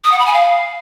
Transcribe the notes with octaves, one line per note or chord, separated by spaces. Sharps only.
D#6
F#5
B5
G#5
F5